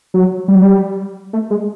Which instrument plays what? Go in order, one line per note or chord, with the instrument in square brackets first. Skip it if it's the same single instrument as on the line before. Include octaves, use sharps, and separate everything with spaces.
[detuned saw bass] F#3
G3
F#3
G3
A3
G#3